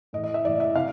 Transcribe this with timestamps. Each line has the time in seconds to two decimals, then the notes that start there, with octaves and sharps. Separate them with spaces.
0.13 A2 D#5
0.18 E3
0.24 D#5
0.34 E5
0.45 A2 E3 D5
0.60 E5
0.75 C3 E3 F5